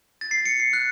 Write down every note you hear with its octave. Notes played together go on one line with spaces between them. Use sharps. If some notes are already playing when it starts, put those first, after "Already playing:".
A6
C7
C#7
C7
F#6